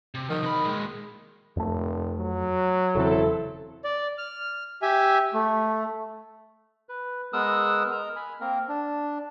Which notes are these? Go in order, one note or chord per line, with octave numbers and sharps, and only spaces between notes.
C3
D#3 F3
C3 B5
A#2 G#3
F1 F2 A3
F#3
E1 C#3 E3 C4 E4 A4
D5
F6
G4 E5 G#5
A3
B4
G#3 B3 A#4 D#6 E6 F#6
A#4 D#5 A#5
G#5 B5
A#3 C4 A#4
D4